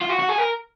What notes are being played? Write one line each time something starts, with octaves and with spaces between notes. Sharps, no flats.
F4
F#4
F#4
G#4
A#4